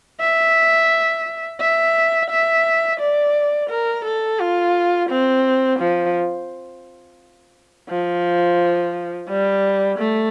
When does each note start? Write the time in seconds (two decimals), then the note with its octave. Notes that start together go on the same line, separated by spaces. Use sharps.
0.21 E5
1.61 E5
2.30 E5
3.00 D5
3.70 A#4
4.05 A4
4.40 F4
5.10 C4
5.80 F3
7.89 F3
9.29 G3
9.99 A3